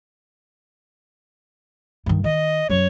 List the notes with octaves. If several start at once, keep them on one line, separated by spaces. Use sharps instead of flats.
G2 D#3
D#3 D#5
F#2 F#3 C#5